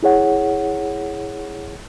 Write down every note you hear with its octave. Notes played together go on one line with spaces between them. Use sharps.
E4 G#4 C#5 F#5